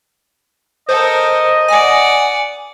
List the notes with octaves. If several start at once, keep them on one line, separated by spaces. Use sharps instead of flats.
A4 A#4 C5 D#5
D5 F#5 G#5